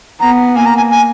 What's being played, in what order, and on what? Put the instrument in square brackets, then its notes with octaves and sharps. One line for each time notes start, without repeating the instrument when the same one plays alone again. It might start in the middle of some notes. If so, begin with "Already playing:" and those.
[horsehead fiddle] B3 [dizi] A#5
[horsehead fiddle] A#3 [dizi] G#5
[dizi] A#5
G#5
G#5